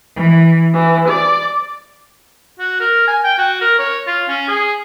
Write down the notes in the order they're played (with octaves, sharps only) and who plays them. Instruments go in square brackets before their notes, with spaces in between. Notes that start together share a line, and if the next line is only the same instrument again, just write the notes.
[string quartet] E3
E3
D5
[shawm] F#4
A#4
G#5
G5
F#4
A#4
C#5
F4
C#4
G#4